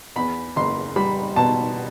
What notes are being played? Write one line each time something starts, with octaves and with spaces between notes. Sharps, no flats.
E2 B5
F#1 C6
G3 B5
B2 A5